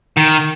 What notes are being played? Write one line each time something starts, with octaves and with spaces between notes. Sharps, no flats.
D#3